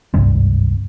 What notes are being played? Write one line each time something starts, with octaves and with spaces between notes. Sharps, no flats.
G#1 C#2 G2 C3